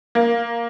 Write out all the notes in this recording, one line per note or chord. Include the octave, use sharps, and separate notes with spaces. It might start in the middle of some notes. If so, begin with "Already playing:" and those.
A#3